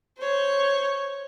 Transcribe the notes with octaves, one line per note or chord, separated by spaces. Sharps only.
C5 C#5